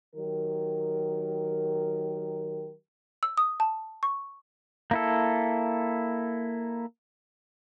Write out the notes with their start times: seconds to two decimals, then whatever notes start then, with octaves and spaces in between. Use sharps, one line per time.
0.16 D#3 F#3 G4 A#4
3.23 E6
3.38 D#6
3.60 A5
4.03 C#6
4.91 A#3 E4 A4